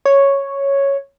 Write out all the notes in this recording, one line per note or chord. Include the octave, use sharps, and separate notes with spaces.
C#5